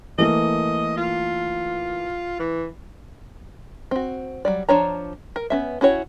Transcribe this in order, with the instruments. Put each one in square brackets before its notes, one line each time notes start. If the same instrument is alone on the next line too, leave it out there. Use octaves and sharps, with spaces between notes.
[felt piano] E3 A3 A#3 [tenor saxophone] D#5
[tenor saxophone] F4
E3
[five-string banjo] C4 F#4
F#3 G3 D5
F3 D4 C#5 A#5
A#4
B3 C#4 E5
C#4 E4 F#4 C#5